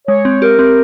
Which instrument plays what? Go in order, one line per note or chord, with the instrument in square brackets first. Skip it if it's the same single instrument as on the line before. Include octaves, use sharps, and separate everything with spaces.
[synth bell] G#3 [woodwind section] C#5
[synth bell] C4
[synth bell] G4 [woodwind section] A#4
[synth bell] C4